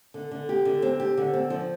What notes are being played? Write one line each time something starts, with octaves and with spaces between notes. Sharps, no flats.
D3
D3
G4
D3
C4
G4
D3
C4
F3